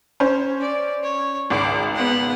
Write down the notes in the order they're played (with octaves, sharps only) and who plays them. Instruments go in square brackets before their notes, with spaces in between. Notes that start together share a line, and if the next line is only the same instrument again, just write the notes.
[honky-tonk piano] C#4 C5
[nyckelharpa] D5
C#5
[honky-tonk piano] G#1 C#2 [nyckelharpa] D6
[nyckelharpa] B3 F#5